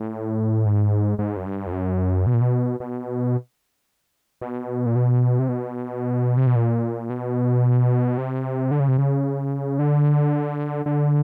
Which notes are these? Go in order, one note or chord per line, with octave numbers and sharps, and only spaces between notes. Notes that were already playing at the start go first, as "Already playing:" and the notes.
Already playing: A2
G#2
G#2
F#2
G2
F2
F#2
B2
A#2
B2
B2
B2
A#2
B2
C3
B2
C3
B2
A#2
B2
C3
D3
C#3
C3
C#3
D3
D3